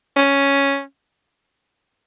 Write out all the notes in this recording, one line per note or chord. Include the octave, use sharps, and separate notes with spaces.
C#4